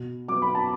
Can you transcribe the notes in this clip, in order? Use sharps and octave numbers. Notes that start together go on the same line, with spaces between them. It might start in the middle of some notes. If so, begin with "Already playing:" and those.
Already playing: B2
F#3 B3 D6
B5
A5